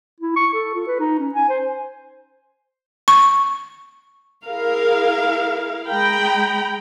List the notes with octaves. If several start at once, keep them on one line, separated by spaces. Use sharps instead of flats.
E4
C#6
A4
F4
B4
D#4
C#4
G#5
C5
C#6
E4 G#4 A#4 F5
G#3 G5 A#5 B5